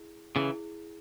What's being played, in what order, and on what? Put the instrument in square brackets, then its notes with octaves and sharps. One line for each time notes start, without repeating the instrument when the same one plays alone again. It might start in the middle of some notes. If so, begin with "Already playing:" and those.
Already playing: [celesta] E4 G#4
[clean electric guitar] C#3 E3 [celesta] E4 G#4